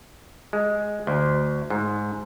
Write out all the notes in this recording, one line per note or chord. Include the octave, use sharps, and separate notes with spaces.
G#3
D2
G#2